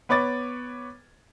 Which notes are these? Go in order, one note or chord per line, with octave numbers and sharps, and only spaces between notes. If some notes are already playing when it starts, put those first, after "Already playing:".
B3 B4 C#5 D6 A6